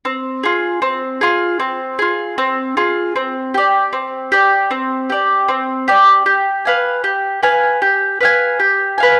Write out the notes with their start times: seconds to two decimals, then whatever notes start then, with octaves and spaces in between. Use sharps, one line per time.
0.05 C4
0.43 F4 G#4
0.82 C4
1.21 F4 G#4
1.60 C4
1.99 F4 G#4
2.38 C4
2.77 F4 G#4
3.16 C4
3.54 G4 D5
3.93 C4
4.32 G4 D5
4.71 C4
5.10 G4 D5
5.48 C4
5.88 G4 D5
6.26 G4
6.65 B4 F5 G#5
7.04 G4
7.43 B4 F5 G#5
7.82 G4
8.21 B4 F5 G#5
8.60 G4
8.98 B4 F5 G#5